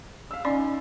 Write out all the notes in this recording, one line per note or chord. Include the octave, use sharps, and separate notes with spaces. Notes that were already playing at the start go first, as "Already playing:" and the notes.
F5 E6
C#4 D#4 D5 G#5 C6